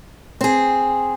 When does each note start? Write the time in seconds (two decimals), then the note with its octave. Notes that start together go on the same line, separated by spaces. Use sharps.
0.41 C4 G#4